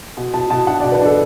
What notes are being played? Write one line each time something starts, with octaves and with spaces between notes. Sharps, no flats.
B2
B2 A5
B2 A5
D4 F#5
D5
B2
B4
D4 A4